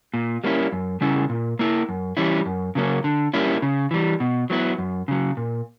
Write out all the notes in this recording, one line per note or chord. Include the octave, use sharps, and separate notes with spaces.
A#2
G3 A#3 C#4 E4
F#2
C#3 G3 C#4 E4
A#2
A#3 E4
F#2
E3 G3 C#4 E4
F#2
C#3 F#3 A#3 C#4
D3
G3 A#3 C#4 E4
C#3
E3 G3
B2
F#3 B3 E4
F#2
C#3 F#3
A#2